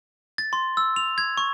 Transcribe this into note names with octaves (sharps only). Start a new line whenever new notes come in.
A6
C6
E6
F7
G#6
C#6